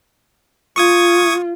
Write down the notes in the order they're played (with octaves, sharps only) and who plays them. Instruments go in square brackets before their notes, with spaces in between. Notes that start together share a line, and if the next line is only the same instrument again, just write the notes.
[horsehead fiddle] F4 [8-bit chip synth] C#6 D#6 G#6